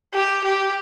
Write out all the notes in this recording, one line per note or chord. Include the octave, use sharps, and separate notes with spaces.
G4
G4